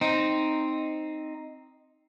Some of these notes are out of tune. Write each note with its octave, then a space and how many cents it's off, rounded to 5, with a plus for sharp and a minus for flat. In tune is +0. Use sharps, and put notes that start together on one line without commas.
C4 +0 D#4 +0